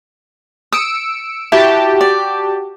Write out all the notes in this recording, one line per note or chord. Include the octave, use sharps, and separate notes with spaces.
D#6 E6 C#7 D7
E4 F#4 G4 A5
D5